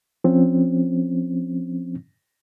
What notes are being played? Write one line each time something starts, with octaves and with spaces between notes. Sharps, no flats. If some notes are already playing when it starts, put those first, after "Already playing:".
F3 C4 C#4